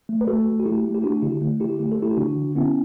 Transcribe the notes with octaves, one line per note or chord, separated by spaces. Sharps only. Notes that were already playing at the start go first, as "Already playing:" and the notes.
A3
B4
A3 F#4 A4
A3
F#4
A3 E4 G4
A3
G4
A3 D4 F#4
D3 E4 G4
A3
D3 E4 G4
A3 G4
A4
A3 E4 G4
D3 D4 F#4
D3
B3 C#4 E4